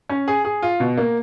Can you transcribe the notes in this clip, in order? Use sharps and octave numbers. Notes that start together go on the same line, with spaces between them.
C#4
G#4
G#4
F4
B2
A#3